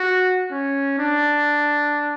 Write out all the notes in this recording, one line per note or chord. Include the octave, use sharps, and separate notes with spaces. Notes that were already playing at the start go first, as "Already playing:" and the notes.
Already playing: F#4
C#4
D4